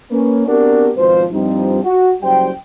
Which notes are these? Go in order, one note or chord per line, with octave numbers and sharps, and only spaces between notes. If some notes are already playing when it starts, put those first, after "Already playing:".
A#3 C#4 B4
B3 C4 D4 F#4 G4 A#4
G#1 B2 F3 C5
G2 F3 C4 D#4
F#4
F#1 F#2 G3 C5 G5